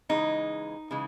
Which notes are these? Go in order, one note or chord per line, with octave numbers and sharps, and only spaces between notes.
C#3 E3 G#3 D#4
C#3 E3 G#3